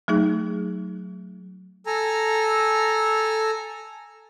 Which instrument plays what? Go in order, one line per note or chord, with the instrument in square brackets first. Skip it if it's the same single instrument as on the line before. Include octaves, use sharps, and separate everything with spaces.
[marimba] F#3 A3 D#4 G#4
[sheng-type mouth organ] A4 G#5 A#5